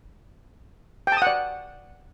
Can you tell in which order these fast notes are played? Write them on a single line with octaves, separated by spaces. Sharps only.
G5 A5 D#6 F#5 D5